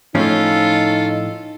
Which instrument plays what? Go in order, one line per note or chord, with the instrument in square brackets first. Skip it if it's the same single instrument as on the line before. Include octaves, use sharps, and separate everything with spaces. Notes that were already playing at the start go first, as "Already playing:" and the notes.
[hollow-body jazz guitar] A2 F3 C#4 [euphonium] D#4 [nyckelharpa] F4 A4